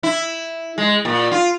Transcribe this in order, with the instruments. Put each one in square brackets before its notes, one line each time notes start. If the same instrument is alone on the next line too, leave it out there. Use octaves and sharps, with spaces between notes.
[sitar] E4
G#3
A#2
F4